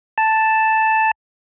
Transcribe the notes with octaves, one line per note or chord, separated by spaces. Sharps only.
A5